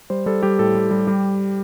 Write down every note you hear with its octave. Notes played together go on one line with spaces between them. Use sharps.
G3 C5
G3 A4
G3 G4
A2 A4
G3
G3
G3 G4